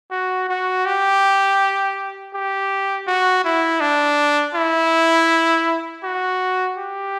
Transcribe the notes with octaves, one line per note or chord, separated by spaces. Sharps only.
F#4
F#4
G4
G4
F#4
E4
D4
E4
F#4
G4